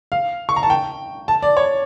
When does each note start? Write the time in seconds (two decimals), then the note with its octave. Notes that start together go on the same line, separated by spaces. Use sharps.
0.12 F5
0.49 C#6
0.56 A#5
0.63 A5
0.70 G5
1.28 A5
1.42 D5
1.57 C#5